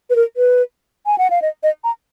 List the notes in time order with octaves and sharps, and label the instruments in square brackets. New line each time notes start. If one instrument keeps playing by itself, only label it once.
[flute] B4
A#4
B4
G#5
F#5
F5
D#5
D#5
A#5